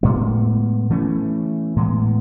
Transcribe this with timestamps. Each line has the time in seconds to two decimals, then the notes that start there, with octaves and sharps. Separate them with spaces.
0.03 A2 G#3 B3
0.90 E3 A3 C#4
1.76 A2 G#3 B3